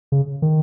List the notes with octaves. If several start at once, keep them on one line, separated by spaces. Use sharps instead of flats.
C#3
D#3